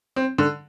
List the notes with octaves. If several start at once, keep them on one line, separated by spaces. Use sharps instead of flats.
C4
D3